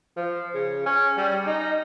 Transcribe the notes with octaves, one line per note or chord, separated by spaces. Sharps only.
F3
C#3
C#4
G3
D#4